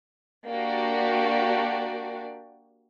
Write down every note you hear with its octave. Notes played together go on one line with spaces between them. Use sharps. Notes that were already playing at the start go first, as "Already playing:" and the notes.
A#3 D4 F#4 G4 D5